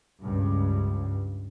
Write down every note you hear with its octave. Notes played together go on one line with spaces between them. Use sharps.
C#2 G2